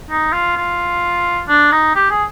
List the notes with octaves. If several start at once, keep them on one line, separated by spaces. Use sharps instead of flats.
D#4
F4
F4
D4
D#4
G4
G#4